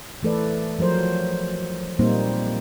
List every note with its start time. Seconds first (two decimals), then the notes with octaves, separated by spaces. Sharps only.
0.23 E3 A3 A4 B4 D5
0.79 F3 F#3 A#4 C5
1.99 A#2 G3 A#3 C4 D#4 C5